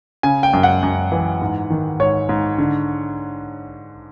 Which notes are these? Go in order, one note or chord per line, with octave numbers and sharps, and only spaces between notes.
C#3 G#5
G5
F#2
F#5
F#2
E3
G#2
D#3
G#2 C#5
G#2
D3